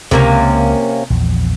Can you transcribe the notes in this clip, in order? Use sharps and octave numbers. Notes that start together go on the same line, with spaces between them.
C#2 C3 A#3 C#4
A#1 E2 F3